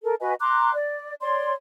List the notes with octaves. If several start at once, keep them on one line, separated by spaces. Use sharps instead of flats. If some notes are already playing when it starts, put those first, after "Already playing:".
A4 A#4
F#4 B4 D#5 G#5
A#5 C6 D6 F#6
D5
C#5 D5 C6